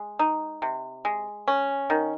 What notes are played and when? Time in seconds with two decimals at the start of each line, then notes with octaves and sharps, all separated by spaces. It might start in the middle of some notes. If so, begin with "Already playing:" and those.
Already playing: G#3
0.19 D#4
0.62 C3
1.05 G#3
1.48 C#4
1.90 D#3